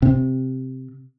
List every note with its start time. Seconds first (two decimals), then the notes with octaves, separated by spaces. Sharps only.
0.02 C3